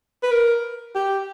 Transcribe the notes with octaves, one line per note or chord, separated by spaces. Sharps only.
B4
A#4
G4